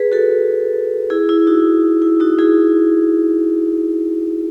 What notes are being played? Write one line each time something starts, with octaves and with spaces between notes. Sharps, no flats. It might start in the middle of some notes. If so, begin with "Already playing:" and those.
Already playing: G#4 B4
F#4 A4
E4 G#4
E4
D#4 F#4
E4
D#4 F#4
E4 G#4